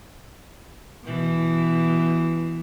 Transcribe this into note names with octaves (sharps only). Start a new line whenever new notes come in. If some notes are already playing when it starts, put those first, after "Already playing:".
B2 E3